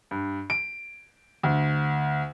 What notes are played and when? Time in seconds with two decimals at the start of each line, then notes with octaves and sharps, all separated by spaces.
0.11 G2
0.50 D7
1.43 D2